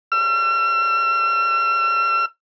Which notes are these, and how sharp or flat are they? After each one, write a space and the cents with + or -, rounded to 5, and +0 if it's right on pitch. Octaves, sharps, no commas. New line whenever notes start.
E6 +45